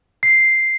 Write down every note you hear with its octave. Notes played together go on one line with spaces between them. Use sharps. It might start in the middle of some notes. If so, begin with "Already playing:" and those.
C7